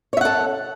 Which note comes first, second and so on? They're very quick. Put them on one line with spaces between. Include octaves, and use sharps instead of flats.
C#5 E5 F#5 A4